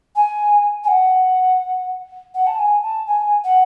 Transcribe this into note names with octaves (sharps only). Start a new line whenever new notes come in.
G#5
G#5
F#5
F#5
A5
G#5
A5
G#5
F#5